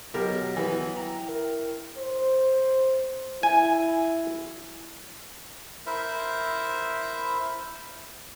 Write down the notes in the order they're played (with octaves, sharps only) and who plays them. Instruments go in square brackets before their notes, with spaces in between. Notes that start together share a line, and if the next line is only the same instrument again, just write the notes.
[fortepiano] B2 G4 A#4 [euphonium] F#3 [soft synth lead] A#6
[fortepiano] E3 B3 [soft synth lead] F#4
[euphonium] E4 [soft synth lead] G5 [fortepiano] A#5
[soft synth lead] A#4
[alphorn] C5
[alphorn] E4 [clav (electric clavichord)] G#5
[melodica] E4 A#4 C5 E5